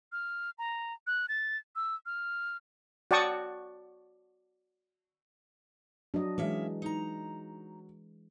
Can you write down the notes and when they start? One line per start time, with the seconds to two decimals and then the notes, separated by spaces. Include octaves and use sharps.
0.12 F6
0.58 A#5
1.07 F#6
1.29 A6
1.76 E6
2.06 F6
3.11 F#4 D5 G5 A5 C#6 D#6
6.14 F#3 D4 D#5
6.38 E3 G#3 A#3 C#4 E5
6.82 D#4 A#5